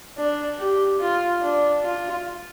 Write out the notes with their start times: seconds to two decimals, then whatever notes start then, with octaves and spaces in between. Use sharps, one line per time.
0.18 D4
0.59 G4
1.00 F4
1.42 D4
1.83 F4